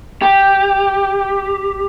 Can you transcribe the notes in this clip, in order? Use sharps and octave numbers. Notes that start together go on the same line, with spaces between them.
G4